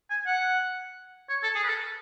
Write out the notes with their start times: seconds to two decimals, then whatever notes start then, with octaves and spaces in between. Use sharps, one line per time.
0.10 G#5
0.27 F#5
1.29 C#5
1.43 A4
1.55 G#4
1.64 B4
1.69 A4